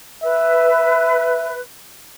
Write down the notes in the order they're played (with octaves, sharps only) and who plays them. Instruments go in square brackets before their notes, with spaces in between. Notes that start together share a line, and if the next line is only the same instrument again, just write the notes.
[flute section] B4 [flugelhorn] E5